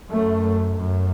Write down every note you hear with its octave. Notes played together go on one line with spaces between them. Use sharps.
F#2 A3
F#2